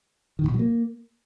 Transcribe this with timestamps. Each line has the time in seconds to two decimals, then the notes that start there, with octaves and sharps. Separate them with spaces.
0.39 D#3
0.44 A2
0.49 B2
0.54 F#3
0.59 A#3